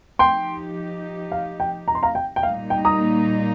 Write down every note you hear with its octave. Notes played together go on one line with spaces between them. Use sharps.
F3 D#4 G4 G5 C6
F5
G5
A#5
C6
F5 A#5
G5
G5
A#2 G3 A#3 D#4 F5
G5
A#5 D#6